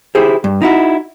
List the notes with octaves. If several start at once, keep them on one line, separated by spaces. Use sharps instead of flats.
E4 G4 G#4 C5
G2
D#4 E4 F#4